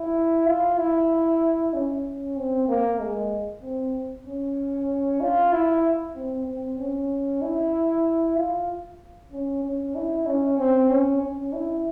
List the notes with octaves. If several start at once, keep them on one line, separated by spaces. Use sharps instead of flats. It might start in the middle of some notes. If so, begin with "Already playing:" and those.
Already playing: E4
F4
E4
C#4
C4
A#3
G#3
C4
C#4
F4
E4
C4
C4
C#4
E4
F4
C#4
C#4
E4
C#4
C4
C#4
C#4
E4